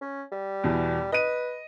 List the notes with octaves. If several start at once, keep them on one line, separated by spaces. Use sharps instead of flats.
C#4
G3
E2 B2
B4 D#5 D#7